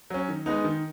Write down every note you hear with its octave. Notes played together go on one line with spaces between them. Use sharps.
F#3 C#4
D#3
G#3 B3 D#4
D#3